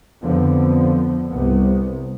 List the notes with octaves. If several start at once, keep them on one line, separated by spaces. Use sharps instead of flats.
F2 D3 F3 B3
C2 C3 B3